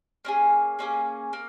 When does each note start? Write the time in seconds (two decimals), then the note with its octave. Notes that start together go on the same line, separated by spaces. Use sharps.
0.25 A#3 C#4 G#4
0.79 A#3 C#4 G#4
1.33 A#3